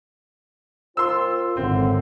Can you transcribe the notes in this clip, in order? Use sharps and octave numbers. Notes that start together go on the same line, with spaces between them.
A#3 C4 F4 C6 E6
G#1 A2 D3 C4